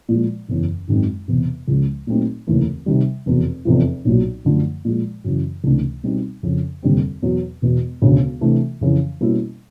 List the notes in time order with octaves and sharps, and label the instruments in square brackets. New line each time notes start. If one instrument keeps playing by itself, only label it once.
[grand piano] A#2 F3 G#3
F#1 E2 C#3 E3
G#1 F#2 D#3 G#3 C4
E1 E2 C3
C#2 C#3 F3 G#3
A#2 F#3 A3 C4 D#4
F1 D#2 C#3 E3 A3
C3 D#3 G3
F1 E2 B2
F1 E2 C3 F3
B1 A#2 F#3
F#2 D3 F3 A3
A#2 F3 G#3
F#2 C#3 E3
C#2 C3 E3 A3 D4
B2 G3 C4 D#4
F2 C#3 F3
F1 D#2 D3 G3 C4
E2 B2 F#3
E1 E2 B2
E1 D2 C#3
C3 E3 A3 D4
F2 C#3 E3
B2 G3 A#3 C#4 E4